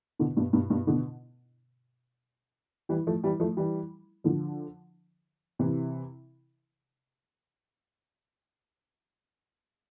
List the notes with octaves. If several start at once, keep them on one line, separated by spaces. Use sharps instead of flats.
B2 D3
G2 B2
G2 B2
G2 B2
B2 D3
E3 G3
F3 A3
E3 G3
F3 A3
E3 G3
D3 F3
C3 E3